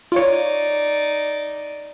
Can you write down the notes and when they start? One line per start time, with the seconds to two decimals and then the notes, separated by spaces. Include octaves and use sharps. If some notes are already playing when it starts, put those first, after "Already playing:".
0.12 D#4 F4 C#5 D5